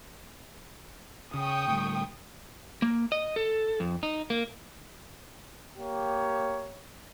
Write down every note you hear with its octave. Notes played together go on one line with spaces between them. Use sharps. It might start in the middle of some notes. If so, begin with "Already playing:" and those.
C#3 G5 C#6 D#6
A2 D3 G3
A#3
D#5
A4
F2
D#4
A#3
A#3 G4 C#5